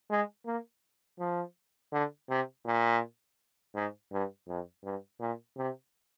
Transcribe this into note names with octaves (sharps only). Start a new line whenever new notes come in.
G#3
A#3
F3
D3
C3
A#2
G#2
G2
F2
G2
A#2
C3